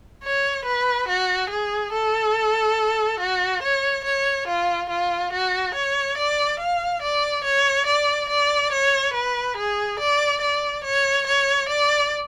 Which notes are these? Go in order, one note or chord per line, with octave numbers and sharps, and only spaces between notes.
C#5
B4
F#4
G#4
A4
F#4
C#5
C#5
F4
F4
F#4
C#5
D5
F5
D5
C#5
D5
D5
C#5
B4
G#4
D5
D5
C#5
C#5
D5